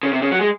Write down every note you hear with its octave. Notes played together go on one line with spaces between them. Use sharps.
C#3
C3
C#3
F#3
G#3